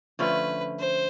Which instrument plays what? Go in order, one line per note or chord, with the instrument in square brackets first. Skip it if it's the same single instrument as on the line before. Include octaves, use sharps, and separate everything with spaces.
[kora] D3 F3 A3 C#4 [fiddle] B4
[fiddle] C5